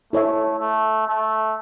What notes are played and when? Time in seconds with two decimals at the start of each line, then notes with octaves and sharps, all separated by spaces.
0.13 A3 E4 A4 C#5 E5
0.59 A3
1.07 A3